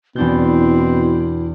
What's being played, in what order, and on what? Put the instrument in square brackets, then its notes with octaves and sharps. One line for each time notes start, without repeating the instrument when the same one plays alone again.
[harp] E2 D4 G6 [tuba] B2 [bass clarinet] C4 [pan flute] E4